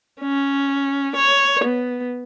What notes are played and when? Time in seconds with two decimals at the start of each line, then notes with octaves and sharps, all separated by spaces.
0.21 C#4
1.16 C#5
1.64 B3